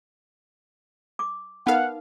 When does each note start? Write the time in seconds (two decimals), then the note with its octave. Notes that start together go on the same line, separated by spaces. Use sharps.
1.19 D6
1.67 B3 D#4 A#4 F5 F#5